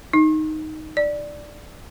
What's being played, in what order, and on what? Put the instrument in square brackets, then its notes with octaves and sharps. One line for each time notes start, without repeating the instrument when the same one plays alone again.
[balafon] D#4
D5